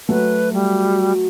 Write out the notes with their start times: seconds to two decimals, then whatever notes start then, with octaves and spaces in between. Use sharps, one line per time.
0.09 F#3 A3 B4
0.54 G3